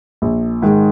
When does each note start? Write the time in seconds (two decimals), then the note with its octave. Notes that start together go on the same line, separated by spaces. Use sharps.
0.22 A#1
0.62 G#2 D#3 G#3